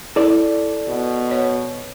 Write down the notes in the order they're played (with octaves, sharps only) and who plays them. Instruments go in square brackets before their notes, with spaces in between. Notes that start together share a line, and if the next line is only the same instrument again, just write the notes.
[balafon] E4 [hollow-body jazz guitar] A4 D5
[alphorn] B2
[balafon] C#5